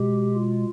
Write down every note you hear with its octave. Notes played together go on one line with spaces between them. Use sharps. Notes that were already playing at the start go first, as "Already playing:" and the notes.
Already playing: B2 G#3 G4
F4